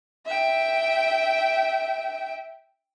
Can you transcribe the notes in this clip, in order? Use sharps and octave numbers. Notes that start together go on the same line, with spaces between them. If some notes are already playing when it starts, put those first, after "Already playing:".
E5 G5